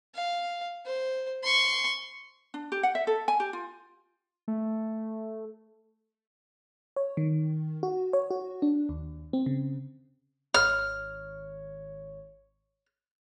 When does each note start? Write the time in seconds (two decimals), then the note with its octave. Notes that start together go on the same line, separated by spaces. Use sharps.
0.14 F5
0.86 C5
1.43 C6 C#6
2.54 D4
2.72 G4
2.83 F#5
2.95 E5
3.07 A4
3.28 G#5
3.40 G4
3.53 F4
4.48 A3
6.96 C#5
7.17 D#3
7.83 F#4
8.13 C#5
8.30 F#4
8.62 D4
8.89 D#2
9.33 C4
9.46 C#3
10.54 G#1 C#5 F6